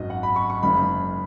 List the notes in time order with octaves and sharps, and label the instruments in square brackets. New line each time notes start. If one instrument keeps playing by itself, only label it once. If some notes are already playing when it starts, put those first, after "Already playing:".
Already playing: [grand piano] G#1 F#2 D#3 F#3 D#5
F#5
B5
C#6
C#6
F#1 F#2 D#3 G#3 B5